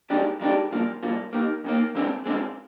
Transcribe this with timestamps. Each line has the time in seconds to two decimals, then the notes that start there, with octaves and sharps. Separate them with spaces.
0.10 F2 D#3 G#3 D4 G4
0.40 F2 D#3 G#3 D4 G4
0.71 C2 A#2 F3 A#3
1.03 C2 A#2 F3 A#3
1.33 D#2 D#3 A#3
1.64 D#2 D#3 A#3
1.95 F2 D3 G#3 C4
2.26 F2 D3 G#3 C4